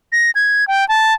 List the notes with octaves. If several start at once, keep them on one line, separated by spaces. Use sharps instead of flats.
A#6
G#6
G5
A5